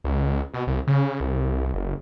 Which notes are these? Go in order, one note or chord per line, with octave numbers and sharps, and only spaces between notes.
C#2
B2
C2
C#3
C2
F#1